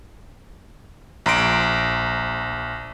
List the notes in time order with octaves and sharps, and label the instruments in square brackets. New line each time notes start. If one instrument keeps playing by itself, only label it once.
[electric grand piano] A#1 A#5 C6 D7